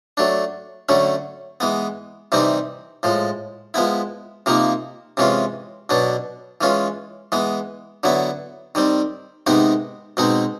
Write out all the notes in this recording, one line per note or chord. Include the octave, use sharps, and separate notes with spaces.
F#3 A3 D4
D3 F#3 A3 C#4
E3 G#3 B3
C3 E3 G3 C4 D#4
A2 F3 G#3
F3 G#3 B3 E4
C3 F3 A#3 D#4
C3 E3 G#3 C#4 F4
B2 F#3 B3 D4
E3 G#3 C#4 F4
E3 G#3 B3
D3 F#3 B3 E4
D#3 G3 C4
C3 D#3 G#3 B3 D#4
B2 G#3 C4 D#4